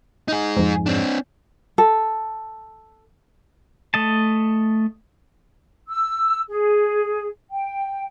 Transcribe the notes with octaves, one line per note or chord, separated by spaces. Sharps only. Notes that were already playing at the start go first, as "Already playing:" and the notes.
D#4 G#4
F2 G#2
C4 D4
A4
A3 D#5 A5
E6
G#4
G5